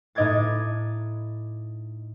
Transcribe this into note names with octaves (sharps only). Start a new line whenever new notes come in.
A2 D#4 D#5 D6 G#6 A6